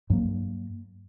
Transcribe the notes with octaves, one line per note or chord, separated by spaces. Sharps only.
G2 F#3 A#3